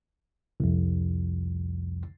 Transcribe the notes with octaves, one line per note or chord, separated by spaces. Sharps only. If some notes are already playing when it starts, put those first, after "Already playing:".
C2 F2